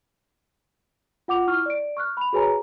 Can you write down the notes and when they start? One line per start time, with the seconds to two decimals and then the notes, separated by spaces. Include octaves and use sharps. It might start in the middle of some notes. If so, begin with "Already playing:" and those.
1.28 F4 F#5 D6 F7
1.48 E4 C#6 F6
1.66 D5 D7
1.97 C#6 F6 F#6
2.17 B5 F7
2.33 F#4 G#4 B4 C#5 G#5 A#5